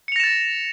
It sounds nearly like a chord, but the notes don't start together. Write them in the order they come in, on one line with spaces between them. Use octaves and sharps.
C#7 F7 A#6 E7 A6